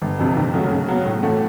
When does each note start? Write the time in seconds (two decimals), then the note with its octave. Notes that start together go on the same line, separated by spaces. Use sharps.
0.02 G1
0.19 F2 C3
0.37 D#2
0.54 C#3 F#3 A3
0.71 C#3
0.88 F#3 B3
1.05 A2
1.23 E3 A3 C#4 F#4